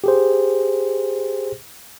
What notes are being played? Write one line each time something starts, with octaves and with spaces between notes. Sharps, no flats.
G4 G#4 C5